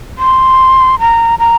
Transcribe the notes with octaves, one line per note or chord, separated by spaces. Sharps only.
C6
A#5
A#5